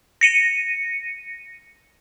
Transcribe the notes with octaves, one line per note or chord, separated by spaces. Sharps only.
A#6 C#7 D#7